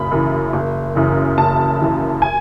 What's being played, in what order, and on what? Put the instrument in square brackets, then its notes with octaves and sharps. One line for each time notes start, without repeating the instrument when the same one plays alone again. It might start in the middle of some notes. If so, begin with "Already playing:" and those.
Already playing: [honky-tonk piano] F#1 F#2 C#3 B5
F#2 C#3 E3
F#1
F#2 C#3 E3
F#1 A5
F#2 C#3 E3
G#5